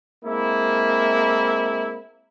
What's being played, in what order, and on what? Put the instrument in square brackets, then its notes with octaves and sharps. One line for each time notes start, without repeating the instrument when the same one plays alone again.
[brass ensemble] G#3 A#3 C4 E4